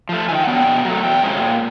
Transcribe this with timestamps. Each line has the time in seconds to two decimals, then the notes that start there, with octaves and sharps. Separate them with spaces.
0.09 F3 A3
0.29 D#3 G#5
0.35 G5
0.43 F#5
0.47 F#3 B3 D4 G5
0.66 B2
0.85 F#3 A3
1.03 E2 G5
1.22 C3 F3 G#3 C#4
1.41 A#2